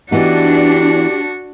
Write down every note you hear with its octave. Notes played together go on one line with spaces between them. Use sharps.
E3 B3 D4 D#4 F#4 G4 C#7